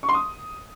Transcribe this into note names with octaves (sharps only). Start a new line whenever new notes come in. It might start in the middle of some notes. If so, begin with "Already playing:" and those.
C#6
C6
D#6